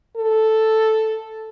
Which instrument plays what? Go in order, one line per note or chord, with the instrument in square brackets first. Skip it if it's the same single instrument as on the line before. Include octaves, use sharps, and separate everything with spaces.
[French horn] A4